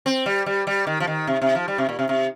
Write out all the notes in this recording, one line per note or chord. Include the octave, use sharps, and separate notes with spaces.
C4
G3
G3
G3
D#3
F3
D#3
C3
C3
F3
G3
C3
A#2
C3
C3